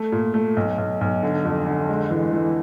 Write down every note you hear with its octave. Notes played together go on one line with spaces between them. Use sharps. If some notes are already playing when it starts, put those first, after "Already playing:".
Already playing: A3
A#2
A3
B1
B1
B1
D3
F2
D3
G#3
E3
E3